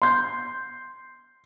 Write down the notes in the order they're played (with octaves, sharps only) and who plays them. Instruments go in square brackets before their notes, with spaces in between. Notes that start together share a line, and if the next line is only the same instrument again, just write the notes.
[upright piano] C6 G6